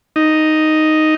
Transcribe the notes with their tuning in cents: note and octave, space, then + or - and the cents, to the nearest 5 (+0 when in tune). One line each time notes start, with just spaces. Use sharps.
D#4 +0